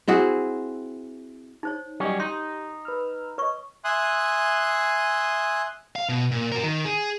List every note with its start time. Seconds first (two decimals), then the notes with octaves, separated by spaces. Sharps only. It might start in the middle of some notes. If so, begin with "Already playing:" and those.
0.08 C4 E4 F#4 G#4
1.63 D#4 C5 C#5
2.00 F#3 G3 C#4 G4 D#5
2.20 D#4 C6
2.85 B4 E6 F6
3.38 B4 C#5 D#5 C#6
3.84 E5 G#5 C6 D#6 F#6
5.96 F5
6.09 B2
6.31 A#2
6.52 F#4 A#4
6.63 D#3
6.85 G#4